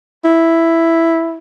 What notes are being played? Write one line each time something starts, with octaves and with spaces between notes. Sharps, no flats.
E4